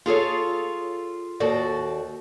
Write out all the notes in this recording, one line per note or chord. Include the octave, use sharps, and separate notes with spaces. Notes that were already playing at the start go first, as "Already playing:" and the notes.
F4 G#4 A4 C#5
D#2 F#4 A4 D5